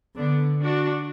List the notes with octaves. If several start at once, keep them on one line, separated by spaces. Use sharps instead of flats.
D3 B3 D4
D4 F#4